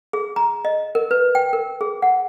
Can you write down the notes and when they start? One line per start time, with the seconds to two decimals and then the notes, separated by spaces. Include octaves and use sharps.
0.13 G#4
0.36 A#5
0.65 D#5
0.95 A#4
1.11 B4
1.35 G5
1.53 A#4
1.81 G#4
2.02 F#5